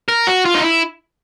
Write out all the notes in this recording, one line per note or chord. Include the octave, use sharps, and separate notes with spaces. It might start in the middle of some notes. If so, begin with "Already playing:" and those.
A#4
F#4
F4
D#4
E4